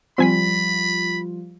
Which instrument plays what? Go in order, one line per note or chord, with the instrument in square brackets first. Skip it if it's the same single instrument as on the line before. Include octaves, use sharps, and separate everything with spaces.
[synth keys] F3 G3 F4 [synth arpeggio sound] C4 G#5 B6 [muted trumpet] B5